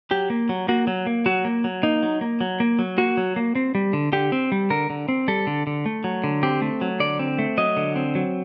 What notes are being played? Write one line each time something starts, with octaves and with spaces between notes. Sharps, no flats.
F#3 G4
A#3
F#3
A#3 F#4
F#3
A#3
F#3 F#4
A#3
F#3
A#3 D#4
F#3
A#3
F#3
A#3
F#3
A#3 F#4
F#3
A#3
C4
G3
D3
D3 G4
C4
G3
D3 A#4
D3
C4
G3 A4
D3
D3
A3
F#3
D3
C4 G4
A3
F#3
D3 D5
C4
A3
F#3 D#5
D3
C4
F#3